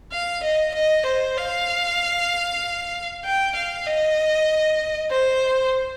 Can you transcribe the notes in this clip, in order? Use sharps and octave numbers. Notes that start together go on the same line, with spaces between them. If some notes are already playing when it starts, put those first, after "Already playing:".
F5
D#5
D#5
C5
F5
G5
F5
D#5
C5